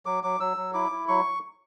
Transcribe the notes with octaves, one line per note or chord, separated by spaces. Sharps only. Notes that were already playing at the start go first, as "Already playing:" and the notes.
F#3 D6
F#3 D6
F#3 E6
F#3
E4 D6
E4
F#3 C#6